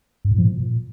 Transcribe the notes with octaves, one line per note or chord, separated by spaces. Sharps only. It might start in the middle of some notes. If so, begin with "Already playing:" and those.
G2
A2
F3
A#2